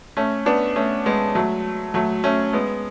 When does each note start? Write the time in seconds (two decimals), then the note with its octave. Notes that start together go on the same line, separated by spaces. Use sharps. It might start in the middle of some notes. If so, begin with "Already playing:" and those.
0.17 A3 C#4
0.46 B3 D4
0.76 A3 C#4
1.06 G#3 B3
1.35 F#3 A3
1.94 F#3 A3
2.24 A3 C#4
2.53 G#3 B3